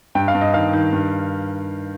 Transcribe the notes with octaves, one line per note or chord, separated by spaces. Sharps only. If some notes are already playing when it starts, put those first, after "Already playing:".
G2 G5
F5
G2
D#5
D#3 F5
D#3
G2